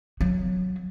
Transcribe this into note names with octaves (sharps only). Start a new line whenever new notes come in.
F#3